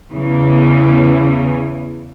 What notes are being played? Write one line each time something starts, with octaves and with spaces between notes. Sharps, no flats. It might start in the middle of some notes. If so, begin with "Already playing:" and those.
E2 C#3 E3